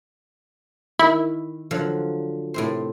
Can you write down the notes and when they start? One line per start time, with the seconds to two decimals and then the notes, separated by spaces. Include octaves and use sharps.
0.99 D#3 E4 E5 B5
1.71 D3 F3 F#3
2.54 A2 C3 C5